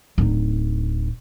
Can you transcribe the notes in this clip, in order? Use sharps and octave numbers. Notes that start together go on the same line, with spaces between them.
D1 D#4